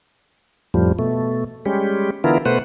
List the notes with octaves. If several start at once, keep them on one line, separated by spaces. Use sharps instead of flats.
F2 A2 F3 G3
B2 A3
G3 G#3 C#4 G4
D3 E3 B3 E4 F4 A#4
B2 A3 B4 C5 F#5